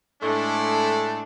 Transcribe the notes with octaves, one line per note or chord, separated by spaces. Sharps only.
A2 G#3 A3 D4